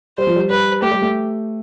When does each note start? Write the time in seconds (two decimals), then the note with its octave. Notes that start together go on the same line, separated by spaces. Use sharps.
0.18 G3 C5
0.27 F3
0.36 G3
0.50 G3 B4
0.82 A3 G4
0.92 G3
1.02 A3